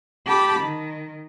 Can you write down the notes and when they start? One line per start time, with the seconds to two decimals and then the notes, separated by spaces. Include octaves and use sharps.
0.27 G4 A5 B5
0.61 D#3